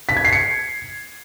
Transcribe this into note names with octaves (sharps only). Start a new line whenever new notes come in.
B6
G#6
C7
C#7